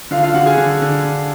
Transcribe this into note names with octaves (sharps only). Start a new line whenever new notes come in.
D3 F4 F5
F4 F5
D3 F#4 F#5
G#4 G#5
D3
D3
D3